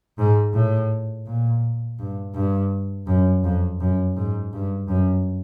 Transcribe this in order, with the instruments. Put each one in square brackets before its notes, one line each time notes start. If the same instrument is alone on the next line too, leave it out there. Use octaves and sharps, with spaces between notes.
[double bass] G#2
A2
A#2
G2
G2
F#2
F2
F#2
G#2
G2
F#2